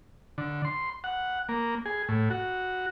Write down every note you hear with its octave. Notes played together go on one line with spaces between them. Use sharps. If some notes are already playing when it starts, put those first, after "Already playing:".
D3
C6
F#5
A#3
G#4
A2
F#4